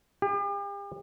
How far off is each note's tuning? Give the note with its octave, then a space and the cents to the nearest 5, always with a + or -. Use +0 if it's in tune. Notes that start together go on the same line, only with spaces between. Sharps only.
G4 +40